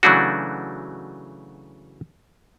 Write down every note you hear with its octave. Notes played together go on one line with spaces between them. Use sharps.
C#3 E3 F#3 A3 D4 F#4